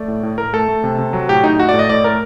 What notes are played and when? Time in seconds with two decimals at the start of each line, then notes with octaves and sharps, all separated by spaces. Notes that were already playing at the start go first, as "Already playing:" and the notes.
Already playing: A3 D5
0.08 A2
0.23 A2
0.38 A2 A#4
0.53 A3 A4
0.68 A3
0.84 C3
0.98 C3
1.13 F#3
1.29 A2 G4
1.44 A2 D#4
1.60 A3 F#4
1.69 D5
1.74 A2
1.79 D#5
1.89 A2 D5
2.04 A3 A#4